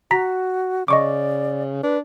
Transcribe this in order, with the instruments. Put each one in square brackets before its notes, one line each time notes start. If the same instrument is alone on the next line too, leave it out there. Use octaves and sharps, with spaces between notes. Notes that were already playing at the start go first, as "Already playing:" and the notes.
[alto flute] F#4 [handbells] A#5 B6
[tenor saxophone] C#3 [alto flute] D5 [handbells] D#5 C#6 D6
[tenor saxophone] D4 [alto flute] B4